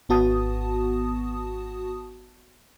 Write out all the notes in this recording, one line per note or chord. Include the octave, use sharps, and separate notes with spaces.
G#1 B3 F#4 A5 D#6